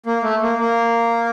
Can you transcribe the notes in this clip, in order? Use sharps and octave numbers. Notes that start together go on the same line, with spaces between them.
A#3
A3
A#3
A#3